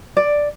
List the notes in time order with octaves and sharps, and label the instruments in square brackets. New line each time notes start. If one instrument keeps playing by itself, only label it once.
[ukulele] D5